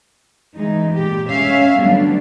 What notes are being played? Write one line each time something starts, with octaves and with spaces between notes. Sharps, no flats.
E3 G#3 D#4
A#2 G4
G#3 C#4 E5 F5
D3 F#3 G3 A3 B3 D4